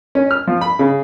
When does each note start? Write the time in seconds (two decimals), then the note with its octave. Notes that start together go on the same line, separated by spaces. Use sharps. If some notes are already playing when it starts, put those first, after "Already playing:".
0.15 C#4
0.31 F6
0.47 F3
0.61 B5
0.79 C#3